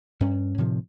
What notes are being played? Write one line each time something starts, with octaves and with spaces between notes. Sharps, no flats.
G2 C#4
A2 C3 D#3 F3